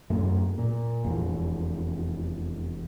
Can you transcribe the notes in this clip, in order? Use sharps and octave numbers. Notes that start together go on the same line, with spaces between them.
F#2 A3 A#3
A#2
F1 E2